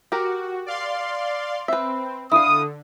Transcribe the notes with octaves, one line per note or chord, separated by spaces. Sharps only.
F#4 G4 A#4
D5 F5 C6
C4 B4 E5
D3 E4 F5 D#6